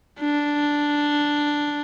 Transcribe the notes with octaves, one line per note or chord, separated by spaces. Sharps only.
D4